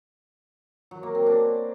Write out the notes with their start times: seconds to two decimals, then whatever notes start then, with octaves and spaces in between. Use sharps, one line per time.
0.91 F#3
1.03 A#3
1.15 C4
1.27 D4